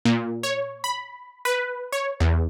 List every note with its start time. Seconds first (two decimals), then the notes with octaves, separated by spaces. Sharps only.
0.05 A#2
0.43 C#5
0.84 B5
1.45 B4
1.92 C#5
2.20 E2